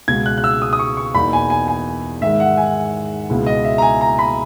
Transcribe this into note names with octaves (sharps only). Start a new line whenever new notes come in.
C#2 B2 G#3 G#6
F#6
F#6
E6
D#6
D#6
C#6
C#6
E2 B2 A#3 D#4 B5
G#5
G#5
G#5
G#2 D#3 G#3 E5
F#5
G#5
C#2 B2 G#3 B3 E4
D#5
E5
A#5
G#5
A#5
B5